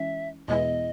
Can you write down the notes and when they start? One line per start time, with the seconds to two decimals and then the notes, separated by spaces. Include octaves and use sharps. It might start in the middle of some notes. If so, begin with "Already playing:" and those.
Already playing: E3 G#3 C#4 E5
0.48 E2 B2 G#3 B3 E4 D#5